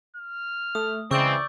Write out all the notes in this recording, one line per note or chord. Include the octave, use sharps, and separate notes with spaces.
F6
A3 D#6
C#3 E3 G#3 C4 D5 C#6 E6 G6